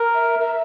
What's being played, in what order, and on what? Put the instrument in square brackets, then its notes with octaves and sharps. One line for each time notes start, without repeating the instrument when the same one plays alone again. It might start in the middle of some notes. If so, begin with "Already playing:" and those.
Already playing: [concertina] A#4
[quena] E5
[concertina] A#4 [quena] E5